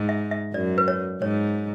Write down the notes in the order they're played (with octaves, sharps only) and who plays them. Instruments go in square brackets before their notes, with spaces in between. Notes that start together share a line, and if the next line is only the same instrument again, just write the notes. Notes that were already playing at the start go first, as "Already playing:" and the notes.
Already playing: [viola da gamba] G#2
[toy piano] E5
E5
[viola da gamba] F#2 [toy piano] D5
[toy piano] B4
C#5
[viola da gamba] G#2 [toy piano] C#5